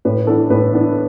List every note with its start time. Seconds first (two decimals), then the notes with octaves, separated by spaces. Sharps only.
0.05 A2 B4
0.27 E3 B3 D4 A4
0.50 A2 B4
0.73 E3 B3 D4